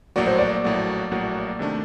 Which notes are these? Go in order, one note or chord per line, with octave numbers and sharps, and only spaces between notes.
A#1 A2 F#3 A#3 F#4 D5
C5
D5
A#1 A2 F#3 A#3 F#4
A#1 A2 F#3 A#3 F#4
C3 D#3 A3 D4